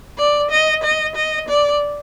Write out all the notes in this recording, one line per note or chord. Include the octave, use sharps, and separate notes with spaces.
D5
D#5
D#5
D#5
D5